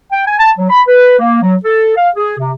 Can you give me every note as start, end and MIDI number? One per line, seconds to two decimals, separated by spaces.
0.12 0.26 79
0.26 0.35 80
0.39 0.50 81
0.57 0.66 54
0.69 0.81 83
0.87 1.18 71
1.19 1.39 58
1.42 1.55 54
1.64 1.93 69
1.96 2.08 77
2.15 2.34 68
2.39 2.53 48